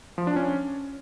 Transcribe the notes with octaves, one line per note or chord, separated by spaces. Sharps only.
F3
D4
C#4